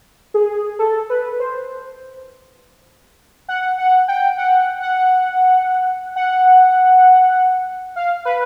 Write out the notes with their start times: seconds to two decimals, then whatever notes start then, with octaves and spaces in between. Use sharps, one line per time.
0.34 G#4
0.79 A4
1.10 B4
1.40 C5
3.48 F#5
3.78 F#5
4.08 G5
4.38 F#5
4.82 F#5
6.16 F#5
7.96 F5
8.25 B4